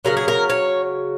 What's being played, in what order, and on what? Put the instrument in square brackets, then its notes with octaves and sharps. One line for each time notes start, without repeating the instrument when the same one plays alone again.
[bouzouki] C#3 F#3 A#4
G#4
A#4
C#5